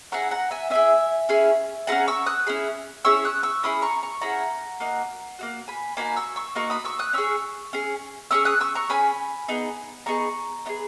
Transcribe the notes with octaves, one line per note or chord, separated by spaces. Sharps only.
C#4 E4 G#4 F#5 A#5
F#5 A#5
E5 G#5
C#4 E4 G#4 E5 G#5
C#4 E4 G#4
C#4 E4 G#4 F#5 A#5
C#6 E6
D#6 F#6
C#4 E4 G#4
C#4 E4 G#4 C#6 E6
D#6 F#6
C#6 E6
C#4 E4 G#4 B5 D#6
A#5 C#6
A#5 C#6
C#4 E4 G#4 F#5 A#5
A#3 D#4 F#4
A#3 D#4 F#4
G#5 B5
A#3 D#4 F#4 G#5 B5
C#6 E6
C#6 E6
A#3 D#4 F#4 A#5 C#6
B5 D#6
C#6 E6
D#6 F#6
C#4 G#4 C#6 E6
C#4 G#4
C#4 G#4 C#6 E6
D#6 F#6
C#6 E6
A#5 C#6
C#4 G#4 G#5 B5
B3 D#4 G#4
B3 D#4 G#4 A#5 C#6
B3 D#4 G#4